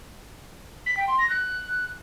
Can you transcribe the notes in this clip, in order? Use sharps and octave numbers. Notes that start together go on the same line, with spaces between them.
B6
G5
C6
A#6
F#6